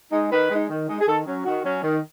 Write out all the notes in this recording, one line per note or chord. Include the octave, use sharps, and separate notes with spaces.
G#3 D#4
D#3 B4
G#3 D#4
D#3
G#3 D#4
G#4
D#3 A4
F#3 C#4
D#3 F#4
F#3 C#4
D#3